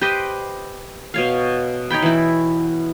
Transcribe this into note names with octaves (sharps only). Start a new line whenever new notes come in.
G4 B4 C5 D#5
B2 C#5 F5
D#4 C#5 G5 B5
E3 E4